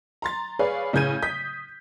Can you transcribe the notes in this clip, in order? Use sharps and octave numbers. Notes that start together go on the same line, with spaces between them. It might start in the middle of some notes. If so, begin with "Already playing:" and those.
A#5 C6 A6
G#4 B4 C#5 D5 F5
A2 C#3 G#4 G6 G#6 D#7
D#6 G6 B6